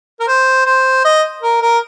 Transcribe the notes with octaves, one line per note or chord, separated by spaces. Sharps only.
A#4
C5
C5
D#5
A#4
A#4